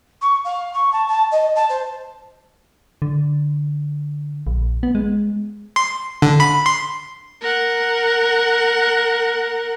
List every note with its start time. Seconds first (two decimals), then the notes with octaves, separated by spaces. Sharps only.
0.21 C#6
0.44 F5
0.73 C#6
0.92 A5
1.08 A5
1.31 D#5
1.55 A5
1.69 C5
3.02 D3
4.47 A#1
4.83 B3
4.95 G#3
5.76 C6
6.22 D3
6.40 B5
6.66 C6
7.41 A#4 F#5